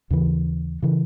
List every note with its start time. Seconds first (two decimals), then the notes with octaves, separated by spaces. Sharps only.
0.10 D#2 C#3 E3
0.82 C#3 E3